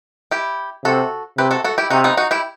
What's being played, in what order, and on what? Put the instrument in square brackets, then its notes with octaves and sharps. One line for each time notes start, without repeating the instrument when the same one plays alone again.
[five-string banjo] E4 G4
[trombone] C3 [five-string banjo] F#4 A4
[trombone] C3 [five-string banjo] G4 B4
[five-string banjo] F#4 A4
F#4 A4
E4 G4
[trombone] C3 [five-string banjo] D#4 F#4
[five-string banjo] B3 D#4
D#4 F#4
E4 G4